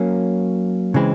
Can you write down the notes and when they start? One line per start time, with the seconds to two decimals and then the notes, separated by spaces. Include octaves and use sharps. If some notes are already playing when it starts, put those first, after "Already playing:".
Already playing: F#3 A#3 C#4
0.94 C#3 E3 G#3 C4